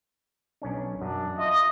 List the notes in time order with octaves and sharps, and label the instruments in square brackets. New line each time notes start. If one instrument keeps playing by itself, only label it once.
[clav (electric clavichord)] B1 C#4 D4
[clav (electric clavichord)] F#2 [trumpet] D4
[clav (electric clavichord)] F4 E5 [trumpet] D#5